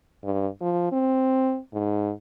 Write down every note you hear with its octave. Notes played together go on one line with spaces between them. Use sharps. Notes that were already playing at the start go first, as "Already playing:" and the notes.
G2
F3
C4
G#2